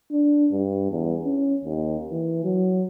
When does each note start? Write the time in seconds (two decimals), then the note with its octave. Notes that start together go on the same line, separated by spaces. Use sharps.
0.11 D4
0.52 G2
0.90 E2
1.25 C#4
1.64 D#2
2.11 E3
2.44 F#3